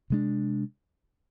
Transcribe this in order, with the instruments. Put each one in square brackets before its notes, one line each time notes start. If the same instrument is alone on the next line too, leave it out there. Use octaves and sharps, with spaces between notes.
[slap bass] C3 G#3 D4